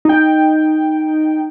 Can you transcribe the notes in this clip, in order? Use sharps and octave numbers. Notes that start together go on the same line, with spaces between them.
D#4 G5